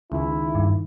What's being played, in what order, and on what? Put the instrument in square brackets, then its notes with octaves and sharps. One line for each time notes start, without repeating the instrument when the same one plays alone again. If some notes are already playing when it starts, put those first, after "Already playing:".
[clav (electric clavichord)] C#2 [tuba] D#3 [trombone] E4
[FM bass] G2